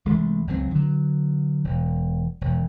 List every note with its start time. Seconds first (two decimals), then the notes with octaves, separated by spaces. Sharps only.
0.05 C2 E3 G#3 A3
0.47 F#1 C#2 F#3 C4
0.71 D3 F#3
1.64 E1
2.41 E1